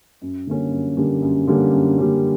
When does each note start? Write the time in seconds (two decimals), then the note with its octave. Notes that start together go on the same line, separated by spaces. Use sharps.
0.22 F#2
0.47 D3 G3 A#3 C#4
0.72 F#2
0.97 D3 G3 A#3 C#4
1.23 F#2
1.47 D3 G3 A#3 C#4
1.73 F#2
1.98 D3 G3 A#3 C#4